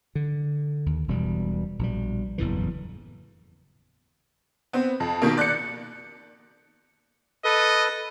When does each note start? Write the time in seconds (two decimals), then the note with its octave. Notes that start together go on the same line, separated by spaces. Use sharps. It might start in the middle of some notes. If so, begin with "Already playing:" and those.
0.15 D3
0.86 D#2
1.08 E1 B2 G3
1.79 A#1 B2 G3
2.38 F#1 E2 A2 E3
4.73 B3 C4
5.00 F2
5.22 B2 D#3 A#3
5.37 D5 F#6 G6 C#7
7.45 A4 B4 D#5